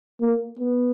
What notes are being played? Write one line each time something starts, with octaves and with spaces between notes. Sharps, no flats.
A#3
B3